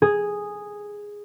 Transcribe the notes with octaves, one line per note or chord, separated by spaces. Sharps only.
G#4